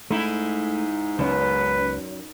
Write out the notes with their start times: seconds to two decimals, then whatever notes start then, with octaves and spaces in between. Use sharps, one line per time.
0.11 G#2 A3 D#4 E4
1.19 C#2 F#2 B3 B4